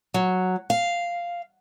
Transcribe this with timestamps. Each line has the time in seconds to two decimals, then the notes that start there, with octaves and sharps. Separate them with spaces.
0.14 F#3
0.70 F5